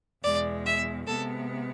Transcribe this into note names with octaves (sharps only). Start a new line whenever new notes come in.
E2 B2 G#3 D5
E5
C3 G#3 B3 A4